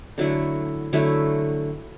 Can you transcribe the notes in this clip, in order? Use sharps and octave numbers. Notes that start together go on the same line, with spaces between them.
D3 F#3 A3 E4
D3 F#3 A3 E4